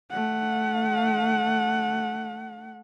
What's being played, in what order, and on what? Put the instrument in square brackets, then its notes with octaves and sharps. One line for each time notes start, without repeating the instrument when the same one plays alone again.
[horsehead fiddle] A3 F#5